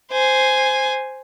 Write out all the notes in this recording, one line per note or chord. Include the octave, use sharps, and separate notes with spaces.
C5 G#5